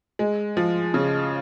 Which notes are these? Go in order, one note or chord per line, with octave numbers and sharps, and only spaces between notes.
G#3
F3
C#3